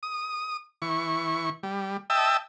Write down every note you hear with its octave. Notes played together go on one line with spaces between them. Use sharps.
D#6
E3 C#6
G3
D#5 E5 G5 A5 E6